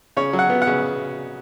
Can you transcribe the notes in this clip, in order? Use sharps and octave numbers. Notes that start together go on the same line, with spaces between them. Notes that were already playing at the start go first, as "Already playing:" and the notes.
C#3 C#5
F#3
F#5
B3
F#5
C#3